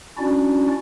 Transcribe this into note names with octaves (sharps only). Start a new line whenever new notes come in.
C#4 D4 E4 F#4 D5